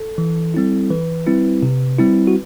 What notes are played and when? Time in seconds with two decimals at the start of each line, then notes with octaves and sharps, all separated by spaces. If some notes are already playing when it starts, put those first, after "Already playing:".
Already playing: A4
0.18 E3
0.54 G3 C4 E4
0.90 E3 B4
1.27 G3 C4 E4
1.63 C3
1.99 G3 C4 E4
2.27 F#4